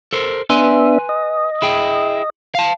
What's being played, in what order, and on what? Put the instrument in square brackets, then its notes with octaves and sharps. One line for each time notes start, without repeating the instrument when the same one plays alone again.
[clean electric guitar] A4 A#4 C5
[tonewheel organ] B3 D4 E5 [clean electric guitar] B4 G#5 C6
[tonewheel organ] D#5
[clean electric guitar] E4 G#4 G5
F5 A5